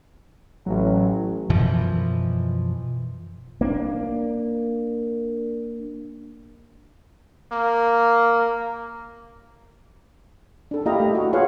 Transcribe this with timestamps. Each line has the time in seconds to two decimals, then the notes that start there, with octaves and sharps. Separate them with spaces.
0.66 A1 F#3
1.50 F#2 B2 E3 F3
3.61 A#3 C#4 D4
7.52 A#3
10.71 D4 A4
10.86 A#3 E4 G4 D#5 F5 A#5
11.00 A3
11.14 F#4 D#5
11.33 F4 G#4 B4 C#5 F5 F#5